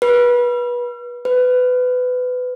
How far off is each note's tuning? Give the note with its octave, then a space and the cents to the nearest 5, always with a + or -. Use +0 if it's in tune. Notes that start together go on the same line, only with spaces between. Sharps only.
B4 -25
B4 +20